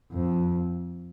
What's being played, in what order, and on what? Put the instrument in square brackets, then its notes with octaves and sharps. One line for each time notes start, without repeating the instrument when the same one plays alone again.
[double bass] F2